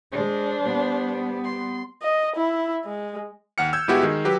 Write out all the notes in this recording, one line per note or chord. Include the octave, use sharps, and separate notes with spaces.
G#3 D4 C5
G3 B3
C6
D#5
E4
G#3
D#2 F#5 F6 C#7
E6 G6 G#6
G1 G#3 B3 E4 F#4 G4
D#3 G#3
F#3 G4 B4